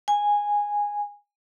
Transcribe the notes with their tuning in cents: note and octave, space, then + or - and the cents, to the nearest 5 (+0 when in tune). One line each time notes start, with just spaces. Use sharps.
G#5 -10